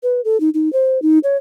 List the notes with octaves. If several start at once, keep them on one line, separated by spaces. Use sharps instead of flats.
B4
A4
D#4
D#4
C5
D#4
C#5